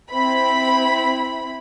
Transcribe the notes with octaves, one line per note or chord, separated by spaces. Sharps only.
C4 E4 B5